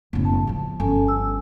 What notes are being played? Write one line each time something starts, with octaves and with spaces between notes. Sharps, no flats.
F#1 A2 B3
A5
F2 F3
G1 C#4 A4 G#5
E6